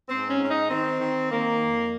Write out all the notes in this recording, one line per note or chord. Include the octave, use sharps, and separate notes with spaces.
G#2 C4
C#4
G#2
C#4
D#4
D#3 C4
D#3
D#3 A#3
F2